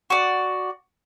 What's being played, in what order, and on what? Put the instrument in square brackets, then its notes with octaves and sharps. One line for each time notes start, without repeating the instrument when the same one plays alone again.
[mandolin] F#4 D5